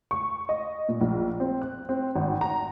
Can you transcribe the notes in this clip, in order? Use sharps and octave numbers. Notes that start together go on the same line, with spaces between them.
C#6
D#5
A#2
A#1
C4
F#6
C4
G#1
A#5